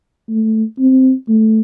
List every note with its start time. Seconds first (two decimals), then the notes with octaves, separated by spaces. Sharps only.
0.29 A3
0.79 C4
1.29 A3